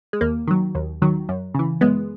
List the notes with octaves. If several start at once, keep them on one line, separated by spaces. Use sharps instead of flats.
G#3
D#2 A#3
D#3 F#3
D#2
D#3 F#3
F#2
C#3 E3
F#2 G#3 B3